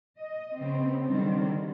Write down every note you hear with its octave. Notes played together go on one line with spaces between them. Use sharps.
D#5
C#3 B3 C4
D3 D#3 F#3 G3 C4